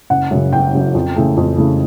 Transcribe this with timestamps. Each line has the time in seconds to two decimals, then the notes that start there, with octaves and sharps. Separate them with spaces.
0.10 F#1 F#5
0.31 F#2 C#3
0.53 F#1 G5
0.73 F#2 C#3
0.95 F2
1.16 C#3 E3 A3
1.37 F2
1.58 C#3 E3 A3